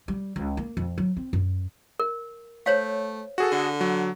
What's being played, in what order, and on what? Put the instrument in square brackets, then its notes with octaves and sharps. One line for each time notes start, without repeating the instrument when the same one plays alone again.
[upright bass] G3
C#2
A#3
F2
F#3
C4
F#2
[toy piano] A#4
[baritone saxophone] A3 [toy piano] C5 C#5 F5
[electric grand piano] F#4 G#4 A4
[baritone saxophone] D3
[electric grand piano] F#3